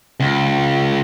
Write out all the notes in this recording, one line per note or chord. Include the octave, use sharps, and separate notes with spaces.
C#2